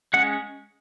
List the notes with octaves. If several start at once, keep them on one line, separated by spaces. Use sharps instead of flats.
G#3 C#4 F#5